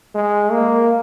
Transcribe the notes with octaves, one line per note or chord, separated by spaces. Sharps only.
G#3
A#3